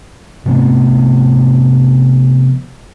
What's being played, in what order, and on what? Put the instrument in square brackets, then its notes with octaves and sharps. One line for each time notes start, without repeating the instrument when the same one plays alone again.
[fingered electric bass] C3 F3 A3 B3